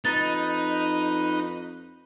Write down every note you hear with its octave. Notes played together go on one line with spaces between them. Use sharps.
F2 D#4 B4 A6